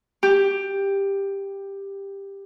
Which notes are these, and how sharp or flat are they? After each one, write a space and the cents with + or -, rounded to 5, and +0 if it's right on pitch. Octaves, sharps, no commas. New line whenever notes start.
G4 +10